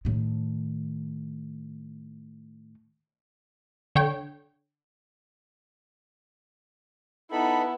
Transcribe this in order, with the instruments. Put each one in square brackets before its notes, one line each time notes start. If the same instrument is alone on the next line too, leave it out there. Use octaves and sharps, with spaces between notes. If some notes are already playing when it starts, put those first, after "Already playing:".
[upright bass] A2 D#3
[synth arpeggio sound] D3 C#5 G5
[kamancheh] B3 E4 [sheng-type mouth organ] D#4 A4 B5